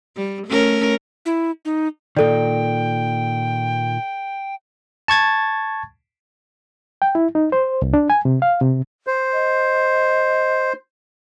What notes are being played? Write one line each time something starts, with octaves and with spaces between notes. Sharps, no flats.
G3
A3 C#4 A#4
E4
D#4
A#2 D#3 A4 D5 G5
A5 C#6 G#6 A6
G5
E4
D#4
C5
C2
D4
G#5
C3
F5
C3
C5
D#5